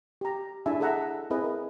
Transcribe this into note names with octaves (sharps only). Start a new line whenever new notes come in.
G4 A#5
D4 E4 G#4 E5 G#5 A5
G#4 A4 D#5 E5 F#5 A#5
C4 E4 G#4 B4 D#5
A#4